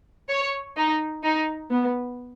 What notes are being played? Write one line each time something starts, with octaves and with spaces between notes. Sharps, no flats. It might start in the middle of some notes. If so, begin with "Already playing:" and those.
C#5
D#4
D#4
B3